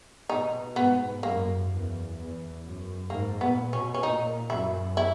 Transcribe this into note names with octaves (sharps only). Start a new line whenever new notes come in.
B2 D#4
G#2 B3
F#2 A#3
E2
E2
F#2
G#2 A#3
A#2 B3
B2 C#4
C#4
A#2 D#4
F#2 E4
E4